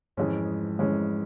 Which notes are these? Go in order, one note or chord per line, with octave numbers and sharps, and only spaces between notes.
F2 G#2 E3 G#3 C#4
F2 E3 G#3 C#4